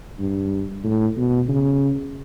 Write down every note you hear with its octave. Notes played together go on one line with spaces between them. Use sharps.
G2
A2
B2
C#3